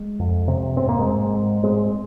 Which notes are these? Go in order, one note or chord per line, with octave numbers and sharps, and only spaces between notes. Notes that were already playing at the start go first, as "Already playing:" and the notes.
Already playing: G#3
F2
C3
G#2 C4
A#3
G#3 C4
G#2
G#2
G#2 G#3 C4